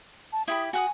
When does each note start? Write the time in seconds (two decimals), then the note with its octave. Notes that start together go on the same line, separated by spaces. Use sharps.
0.33 A5
0.48 E4 G4 B5 D#6
0.73 F#4 F#5 G#5 D#6